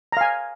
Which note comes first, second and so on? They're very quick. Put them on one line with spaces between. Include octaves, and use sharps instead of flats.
A#5 F5 G#5